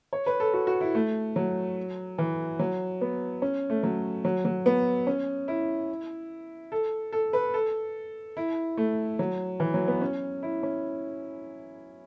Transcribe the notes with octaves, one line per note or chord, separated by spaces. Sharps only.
C#5
B4
A4
F#4
F#4
E4
A3
F#3
E3
F#3
B3
C#4
A3
F#3
F#3
F#3
B3
C#4
E4
A4
A4
B4
A4
E4
A3
F#3
E3
F#3
B3
C#4
E4
C#4